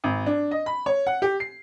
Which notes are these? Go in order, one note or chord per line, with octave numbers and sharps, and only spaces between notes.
G#1
D4
D#5
B5
C#5
F#5
G4
C7